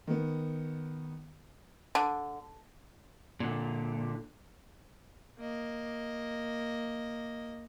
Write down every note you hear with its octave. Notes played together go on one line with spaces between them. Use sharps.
D#3 B3
D3
A#2 D3
A#3 D#5